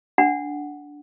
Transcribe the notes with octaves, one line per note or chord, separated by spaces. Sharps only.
D4 F#5